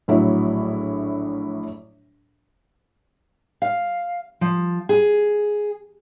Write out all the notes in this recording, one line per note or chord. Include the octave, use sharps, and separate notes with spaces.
A#1 A2 F#3 E4 E5
F5
F3
G#4